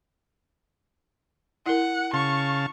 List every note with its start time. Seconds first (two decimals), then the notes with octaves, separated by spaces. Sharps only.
1.66 E4 A#4 F#5
2.13 C#3 F5 A5 C#6